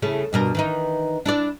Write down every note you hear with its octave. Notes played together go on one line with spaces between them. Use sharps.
C#3 A3 E4
G2 B2 A#4
D#3 E3 D#4
D4 E4 D5